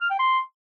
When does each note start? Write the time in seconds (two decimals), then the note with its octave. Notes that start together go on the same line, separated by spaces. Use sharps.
0.01 F6
0.10 G5
0.19 C6